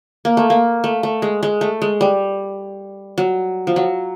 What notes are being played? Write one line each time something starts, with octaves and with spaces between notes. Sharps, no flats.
A#3
A3
A#3
A3
A3
G#3
G#3
A3
G#3
G3
F#3
F3
F#3